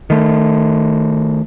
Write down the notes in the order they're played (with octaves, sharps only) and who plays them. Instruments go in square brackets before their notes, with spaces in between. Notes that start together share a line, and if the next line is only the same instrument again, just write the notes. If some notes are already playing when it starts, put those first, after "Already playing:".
[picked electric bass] D#3 A3